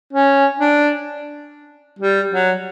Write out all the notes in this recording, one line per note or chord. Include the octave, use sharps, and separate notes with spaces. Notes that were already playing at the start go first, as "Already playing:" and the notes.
C#4
D4
G3
F#3